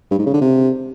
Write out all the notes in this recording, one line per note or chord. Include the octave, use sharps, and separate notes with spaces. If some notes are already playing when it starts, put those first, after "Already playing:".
G2
G#2
C#3
D3
C3